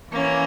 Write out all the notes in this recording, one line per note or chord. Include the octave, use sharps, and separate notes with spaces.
E3 A#3 C#4